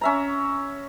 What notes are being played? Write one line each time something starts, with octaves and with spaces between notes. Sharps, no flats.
C#4 E5 A#5